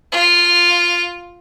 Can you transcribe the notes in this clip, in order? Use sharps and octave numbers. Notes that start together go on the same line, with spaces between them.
F4